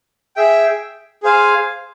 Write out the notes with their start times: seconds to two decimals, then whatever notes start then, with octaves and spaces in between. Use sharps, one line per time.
0.36 G#4 E5 G5
1.23 G#4 C5 F5 G#5